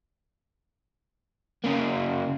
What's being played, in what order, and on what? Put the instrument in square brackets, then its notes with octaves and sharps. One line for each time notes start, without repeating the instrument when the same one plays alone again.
[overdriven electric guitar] C#3 A#3